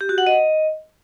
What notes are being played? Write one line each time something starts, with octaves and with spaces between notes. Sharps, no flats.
G4
F#4
F#5
D#5